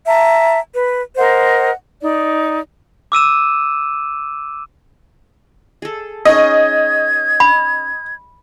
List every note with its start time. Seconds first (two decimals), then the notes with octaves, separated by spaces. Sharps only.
0.06 E5 A5 A#5
0.74 B4
1.16 A#4 C5 D#5 F#5
2.01 D#4 D5
3.12 D6 E6 D#7 E7
5.82 G#4 A4
6.25 C#4 D#4 G#4 D#5 G#6
7.40 B5